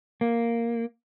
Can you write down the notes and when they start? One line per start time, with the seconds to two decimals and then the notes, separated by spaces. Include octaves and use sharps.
0.21 A#3